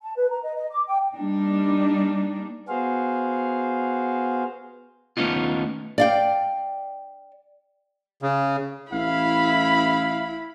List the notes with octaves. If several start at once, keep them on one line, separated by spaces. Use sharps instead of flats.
A5
B4
A#5
D#5
D#5
D6
G5
G3 A#3 D4 D#4
B3 F#4 G#4 C5 F5
D#2 A3 B3 C#4 D#4 F4
D5 F5 G5
C#3
A1 E4 F5 B5